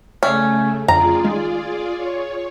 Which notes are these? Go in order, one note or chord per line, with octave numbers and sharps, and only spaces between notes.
C#3 A3 C#4 D5 E5 F5
F2 D3 F4 G#4 D5 A#5
D#3 G#3
C#5